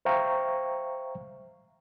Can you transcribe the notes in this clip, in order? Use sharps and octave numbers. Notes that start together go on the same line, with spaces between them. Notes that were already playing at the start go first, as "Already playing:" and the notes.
C5 E5 F5 G5 A#5 C#6